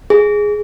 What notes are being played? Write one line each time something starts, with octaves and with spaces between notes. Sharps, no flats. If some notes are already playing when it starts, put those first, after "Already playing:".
G#4